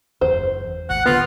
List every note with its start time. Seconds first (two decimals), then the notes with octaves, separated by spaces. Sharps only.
0.21 F#1 E2 C5
0.90 G#1 F#5
1.06 D1 D3 B3 F4